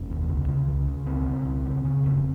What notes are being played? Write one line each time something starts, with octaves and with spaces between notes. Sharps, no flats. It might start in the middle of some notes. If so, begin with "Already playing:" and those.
Already playing: F1 C#4
D#2
C#2
C#3
C#2
C#3
C#2 C4
C#3
C#2
C#3
C#3
F1